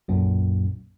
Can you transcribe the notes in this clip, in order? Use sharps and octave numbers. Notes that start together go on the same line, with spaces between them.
B1 F#2 A#2